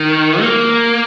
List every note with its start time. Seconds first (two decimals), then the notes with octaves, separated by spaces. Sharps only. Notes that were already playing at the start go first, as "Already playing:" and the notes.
Already playing: D#3
0.41 A#3